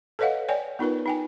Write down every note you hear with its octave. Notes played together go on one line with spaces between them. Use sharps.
A4 B4 C#5 D#5 F5 F#5
C#5 D5 G5 G#5
B3 D#4 F4 A#4 B4
D#4 G5 G#5